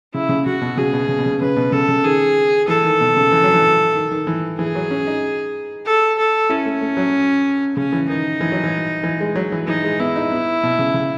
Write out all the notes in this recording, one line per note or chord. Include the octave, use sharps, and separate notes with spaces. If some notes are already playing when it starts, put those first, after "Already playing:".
C#3 E4
C#3
C#3 F#4
B2
C#3 G#4
B2
C#3
B2
C#3
C#3 B4
B2
C#3 A4
C#3
D#3 G#4
E3 A4
D#3
B2
C#3
E3
F#3
E3
D#3
D#3
E3
E3 G#4
F#3
C#4
D#4
A4
A4
C#4 E4
A3
A3
F#3
C#3 C#4
E3
D#3 D#4
E3
F#3
E3
E3
G#3
F#3
E3
E3 D#4
G#3
B3 E4
D#4
B3
B2
C#3
C#3